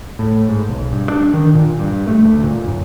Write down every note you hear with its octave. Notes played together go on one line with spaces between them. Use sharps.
A2
G#2
B1
G2
D4
D#3
A#2
G2
A3
D2
A#2
F#2